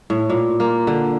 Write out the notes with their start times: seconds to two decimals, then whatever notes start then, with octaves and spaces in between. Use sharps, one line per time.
0.10 A2
0.30 A#2
0.60 A#3
0.87 D3